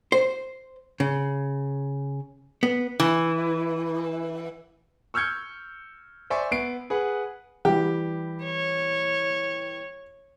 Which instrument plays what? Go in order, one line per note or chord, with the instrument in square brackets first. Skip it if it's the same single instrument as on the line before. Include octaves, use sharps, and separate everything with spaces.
[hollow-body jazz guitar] C5
C#3
B3
[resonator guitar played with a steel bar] E3
[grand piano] C#6 E6 F6 G6 G#6 C#7
C5 D5 E5 G#5 C#6
B3 C7 D7
G#4 B4 F#5
[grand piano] E3 G3 [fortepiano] G4
[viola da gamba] C#5